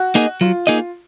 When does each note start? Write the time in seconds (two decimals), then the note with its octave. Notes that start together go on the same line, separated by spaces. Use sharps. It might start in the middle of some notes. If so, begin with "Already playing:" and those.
Already playing: F#4
0.15 A#3 D#4 G#4 D#5
0.41 F#3 F4
0.67 A#3 D#4 G#4 D#5